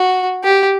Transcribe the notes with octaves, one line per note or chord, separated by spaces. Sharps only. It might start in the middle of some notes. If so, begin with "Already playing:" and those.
Already playing: F#4
G4